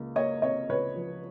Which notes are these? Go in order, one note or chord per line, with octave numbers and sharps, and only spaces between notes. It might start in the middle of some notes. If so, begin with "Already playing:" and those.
Already playing: C#2 A#3
A#3 C#5 D#5
C3 C#5 D#5
C#2 B4 C#5
F3